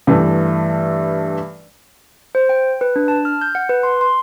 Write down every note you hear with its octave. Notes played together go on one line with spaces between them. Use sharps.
G2 E3 A3
C5
G5
B4
D4
A5
F6
G6
F#5
B4
C6
C6